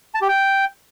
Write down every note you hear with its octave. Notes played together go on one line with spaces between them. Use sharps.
A5
G4
G5